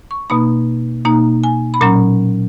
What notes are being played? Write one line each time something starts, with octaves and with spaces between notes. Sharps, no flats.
C#6
B2 A#3 D#4 B5
B2 A#3 D#4 A#5
G#5
B5
A#2 F#3 C#4 A#5